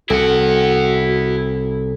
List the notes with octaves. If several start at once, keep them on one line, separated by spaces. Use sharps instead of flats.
C2 E4 F#4 A4 F#5